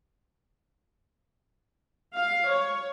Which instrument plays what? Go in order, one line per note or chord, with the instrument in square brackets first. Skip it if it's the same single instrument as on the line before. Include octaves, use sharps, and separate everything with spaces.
[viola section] F5
C#5